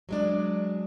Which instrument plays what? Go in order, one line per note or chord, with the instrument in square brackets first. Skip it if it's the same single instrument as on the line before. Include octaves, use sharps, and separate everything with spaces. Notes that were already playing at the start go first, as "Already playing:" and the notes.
[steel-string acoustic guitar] F#3 G#3 D4